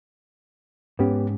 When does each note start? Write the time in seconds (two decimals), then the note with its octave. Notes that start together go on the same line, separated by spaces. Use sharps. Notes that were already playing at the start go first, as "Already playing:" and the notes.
0.99 G#2 B3 C#4 G4